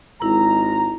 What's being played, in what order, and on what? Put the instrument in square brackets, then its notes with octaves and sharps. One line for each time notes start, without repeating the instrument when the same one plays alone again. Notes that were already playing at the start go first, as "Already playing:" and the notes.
[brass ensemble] G#1 G#3 A#5 [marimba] E4